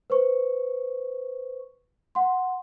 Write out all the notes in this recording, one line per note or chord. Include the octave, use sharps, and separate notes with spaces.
B4 C5 C#6
F#5 C6